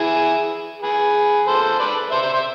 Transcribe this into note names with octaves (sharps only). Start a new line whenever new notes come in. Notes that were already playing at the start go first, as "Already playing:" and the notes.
Already playing: E4 G#4
G#4 B4
A4 C5
B4 D5
C5 E5
C5 E5
C5 E5